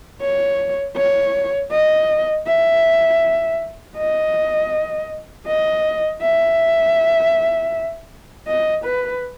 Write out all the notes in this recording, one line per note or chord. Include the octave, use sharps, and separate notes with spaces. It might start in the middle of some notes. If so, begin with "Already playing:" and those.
C#5
C#5
D#5
E5
D#5
D#5
E5
D#5
B4